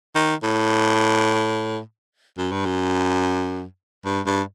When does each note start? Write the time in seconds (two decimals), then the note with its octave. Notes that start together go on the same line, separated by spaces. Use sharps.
0.15 D#3
0.43 A2
2.38 F#2
2.52 G2
2.66 F#2
4.05 G2
4.27 G2